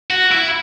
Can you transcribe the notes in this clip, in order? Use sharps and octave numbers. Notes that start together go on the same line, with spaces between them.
F#4
E4